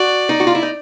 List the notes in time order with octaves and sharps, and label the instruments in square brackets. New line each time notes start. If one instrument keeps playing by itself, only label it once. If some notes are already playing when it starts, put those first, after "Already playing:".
Already playing: [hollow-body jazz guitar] F#4 [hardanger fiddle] D5
[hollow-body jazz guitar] D#4
F#4
F4
E4
D#4